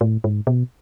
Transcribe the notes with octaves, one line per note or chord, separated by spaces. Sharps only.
A2
G#2
B2